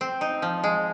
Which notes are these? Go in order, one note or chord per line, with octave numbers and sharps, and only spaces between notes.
C4
D#4
F3
G#3